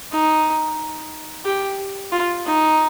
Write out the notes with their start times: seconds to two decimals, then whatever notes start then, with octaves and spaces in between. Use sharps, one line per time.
0.12 D#4
1.45 G4
2.12 F4
2.46 D#4